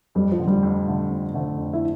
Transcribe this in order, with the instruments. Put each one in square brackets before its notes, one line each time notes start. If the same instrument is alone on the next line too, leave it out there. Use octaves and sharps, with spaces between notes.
[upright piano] F2 [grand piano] G3
[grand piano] F3
[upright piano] D3 A3 C4
[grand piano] G3
[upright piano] F2
D3 A3 C4
F2
D3 A3 C4
F2
[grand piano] E4